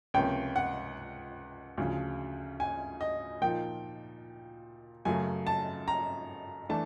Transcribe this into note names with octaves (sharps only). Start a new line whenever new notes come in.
C#2 C3 F3 A#3 C#4 G5
F#5
D2 C#3 F3
G#5
D#5
A#2 F3 A#3 D#4 G5
F#2 C#3 F#3 A3 G#5
A5
A#5
E3 A3 D4 A5